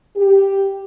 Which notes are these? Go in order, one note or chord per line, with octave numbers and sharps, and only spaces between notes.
G4